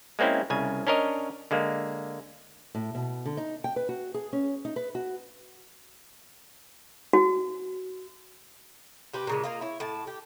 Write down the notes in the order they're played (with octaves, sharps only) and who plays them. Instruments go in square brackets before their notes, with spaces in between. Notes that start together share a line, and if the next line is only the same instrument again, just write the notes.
[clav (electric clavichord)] G#3 A#3 C4 C#4 E4
C2 C#3 G#5
C#4 D4 A#4 C#5 D#5
D3 G#3 A#3
[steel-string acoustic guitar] A2
B2
D3
D#4
G5
B4
F#4
G#4
C#4
D#4
B4
F#4
[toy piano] F#4
[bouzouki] C3 G4 B4
A#2 C#3 G#3
A#3 F4 D#5
E4 C#5
A2 A5
G4